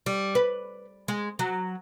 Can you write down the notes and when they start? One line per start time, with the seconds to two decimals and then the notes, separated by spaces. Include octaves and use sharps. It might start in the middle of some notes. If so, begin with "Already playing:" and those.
0.06 G3
0.35 B4
1.08 G#3
1.39 F#3